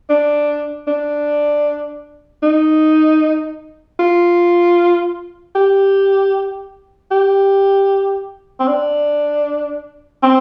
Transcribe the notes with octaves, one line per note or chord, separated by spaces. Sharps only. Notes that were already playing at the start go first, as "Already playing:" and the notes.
D4
D4
D#4
F4
G4
G4
C4
D4
C4